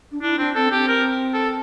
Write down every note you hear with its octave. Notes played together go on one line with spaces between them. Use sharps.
D4
D4 E4
C4 D4
C4 A4
C4 G4
A#4
A4